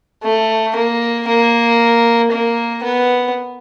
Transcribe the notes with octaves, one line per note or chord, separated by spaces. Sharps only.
A3
A#3
A#3
A#3
B3